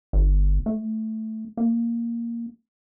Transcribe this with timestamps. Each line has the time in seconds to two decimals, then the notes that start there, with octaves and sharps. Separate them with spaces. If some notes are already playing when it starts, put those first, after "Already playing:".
0.13 G1
0.66 A3
1.57 A#3